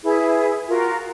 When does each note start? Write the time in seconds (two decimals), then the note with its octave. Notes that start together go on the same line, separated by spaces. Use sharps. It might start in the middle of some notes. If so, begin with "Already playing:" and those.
0.04 E4 G#4 B4 E5
0.68 F4 F#4 A#4